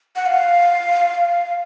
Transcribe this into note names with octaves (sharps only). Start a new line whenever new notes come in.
F#5
F5